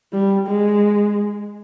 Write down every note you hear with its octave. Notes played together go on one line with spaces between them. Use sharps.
G3
G#3